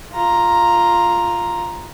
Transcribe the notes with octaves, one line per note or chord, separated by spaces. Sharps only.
F4 A#5